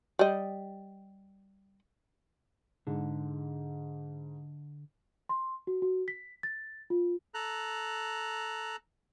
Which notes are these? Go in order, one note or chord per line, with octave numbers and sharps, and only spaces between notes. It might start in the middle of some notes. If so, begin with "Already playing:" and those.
G3 D#5
G#2 D3
C6
F#4
F#4
B6
A6
F4
A4 A#5 F#6